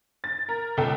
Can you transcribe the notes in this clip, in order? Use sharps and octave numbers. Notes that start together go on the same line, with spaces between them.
A6
A#4
C#2 A4 G5